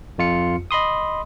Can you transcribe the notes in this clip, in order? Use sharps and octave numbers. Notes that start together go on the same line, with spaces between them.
F2 F4 C#7
D#5 B5 C6 D#6